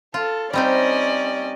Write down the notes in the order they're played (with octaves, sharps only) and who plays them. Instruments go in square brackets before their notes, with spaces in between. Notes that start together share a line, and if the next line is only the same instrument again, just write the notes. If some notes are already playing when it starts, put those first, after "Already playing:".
[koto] F4 [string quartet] A4
[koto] G3 C4 D#4 [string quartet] C#4 D5 D#5